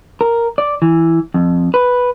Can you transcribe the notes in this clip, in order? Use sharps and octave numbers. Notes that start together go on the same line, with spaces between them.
A#4
D5
E3
F2
B4